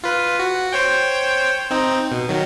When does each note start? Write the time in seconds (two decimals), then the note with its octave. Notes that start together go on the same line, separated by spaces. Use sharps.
0.04 F4 B4
0.39 F#4
0.72 C5 C#5 G5
1.71 C4 D#4
2.11 B2
2.29 D#3 F#3